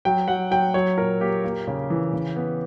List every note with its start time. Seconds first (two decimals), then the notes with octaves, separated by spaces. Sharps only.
0.05 F#3 G5
0.28 F#3 F#5
0.51 F#3 G5
0.74 F#3 C#5
0.97 A#2 A#4
1.21 A#3 G4
1.44 A#3
1.67 C#3
1.90 E3
2.13 C#3
2.36 B3